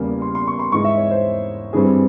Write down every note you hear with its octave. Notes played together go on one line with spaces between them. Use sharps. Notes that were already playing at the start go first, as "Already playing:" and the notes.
Already playing: E2 C#3 G3 A#3
C6
C6
C#6
C6
G#2 E3 G#3 C#6
E5
C#5
C5
G2 E3 G3 C4 G#4